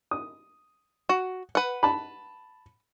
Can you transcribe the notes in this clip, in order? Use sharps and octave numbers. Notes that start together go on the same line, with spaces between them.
D#6
F#4
B4 F#5
A5 B5